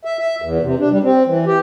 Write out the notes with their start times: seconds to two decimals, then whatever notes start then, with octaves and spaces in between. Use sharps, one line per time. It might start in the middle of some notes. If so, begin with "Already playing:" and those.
0.05 E5
0.19 E5
0.42 E2
0.62 C3
0.79 D4
0.91 G3
1.03 C4
1.27 E3
1.47 G4